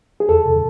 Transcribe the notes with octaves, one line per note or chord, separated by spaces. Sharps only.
G#4
E2 A4
C3